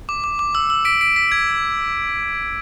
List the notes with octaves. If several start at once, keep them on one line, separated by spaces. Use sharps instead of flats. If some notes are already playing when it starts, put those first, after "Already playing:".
D6
D6
D6
E6
E6
B6 D7
B6 D7
B6
G#6